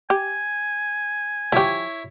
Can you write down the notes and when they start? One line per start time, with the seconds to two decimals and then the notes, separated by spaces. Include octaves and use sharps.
0.10 G4 G#5
1.52 F3 E4 G4 C#5